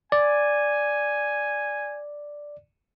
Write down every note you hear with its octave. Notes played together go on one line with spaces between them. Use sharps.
D5 G#5